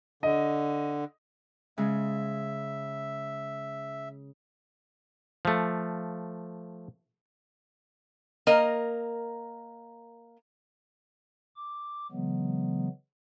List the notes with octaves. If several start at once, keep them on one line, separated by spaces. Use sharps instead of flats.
D3 D#5
C#3 G#3 E5
F3 A3
A#3 A#4 D#5
D6
C#3 E3 F#3 G#3 B3